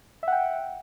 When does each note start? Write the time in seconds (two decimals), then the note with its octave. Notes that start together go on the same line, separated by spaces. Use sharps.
0.23 E5
0.28 F#5
0.32 G5